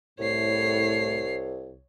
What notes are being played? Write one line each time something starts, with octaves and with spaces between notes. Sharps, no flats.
C2 A2 C#5 C7